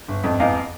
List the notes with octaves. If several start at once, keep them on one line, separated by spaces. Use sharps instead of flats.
G1
F2
E2 D#5 F5